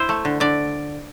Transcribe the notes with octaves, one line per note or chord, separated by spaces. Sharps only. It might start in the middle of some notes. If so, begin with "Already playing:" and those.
Already playing: E4 C5
A3
D3
D3 D5